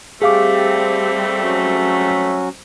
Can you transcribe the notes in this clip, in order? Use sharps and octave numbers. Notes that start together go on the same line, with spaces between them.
G3 A3 C4 G4 G#4 F5 D6
F#3 C#4 F#4